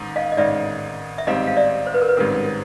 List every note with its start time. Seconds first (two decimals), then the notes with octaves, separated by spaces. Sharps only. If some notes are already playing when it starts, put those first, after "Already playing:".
Already playing: A1 G#2 D#3
0.16 D#5 F5
0.32 D#5
0.37 A1 G#2 D#3 D5 E5
1.18 E5
1.27 A1 G#2 D#3 G3 C4 D#5 F5
1.47 F5
1.57 D5 E5
1.87 C5
1.94 B4
2.02 A#4
2.09 B4
2.17 A1 G#2 D#3 G3 C4 A#4